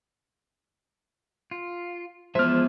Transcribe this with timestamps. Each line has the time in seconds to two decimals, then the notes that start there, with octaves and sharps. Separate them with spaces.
1.51 F4
2.35 F3 G#3 B3 C5 E5 A5 F6